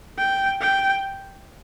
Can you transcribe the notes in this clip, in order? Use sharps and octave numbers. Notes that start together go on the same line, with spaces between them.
G5
G5